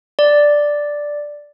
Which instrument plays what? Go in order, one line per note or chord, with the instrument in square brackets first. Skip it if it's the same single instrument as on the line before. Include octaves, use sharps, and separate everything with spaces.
[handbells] D5